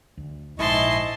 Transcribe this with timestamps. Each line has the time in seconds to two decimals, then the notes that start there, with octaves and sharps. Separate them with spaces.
0.17 D2
0.59 A#1 G#2 E4 D#5 A5 C6 C#6